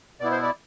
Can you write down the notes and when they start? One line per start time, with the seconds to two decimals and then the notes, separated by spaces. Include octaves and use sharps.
0.20 B2 B3 E4 D5
0.31 C5
0.43 D5